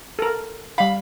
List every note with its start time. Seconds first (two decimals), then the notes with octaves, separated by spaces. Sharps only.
0.19 A4 A#4
0.78 G3 F5 B5